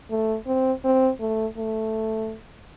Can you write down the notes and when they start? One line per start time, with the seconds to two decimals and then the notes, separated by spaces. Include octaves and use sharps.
0.11 A3
0.47 C4
0.84 C4
1.20 A3
1.57 A3